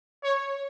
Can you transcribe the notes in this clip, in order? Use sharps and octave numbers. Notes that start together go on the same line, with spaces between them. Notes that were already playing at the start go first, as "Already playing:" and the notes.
C#5